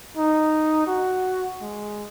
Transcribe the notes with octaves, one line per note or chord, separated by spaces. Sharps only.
D#4
F#4
G#3